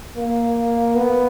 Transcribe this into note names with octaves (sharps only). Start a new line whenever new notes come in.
A#3
B3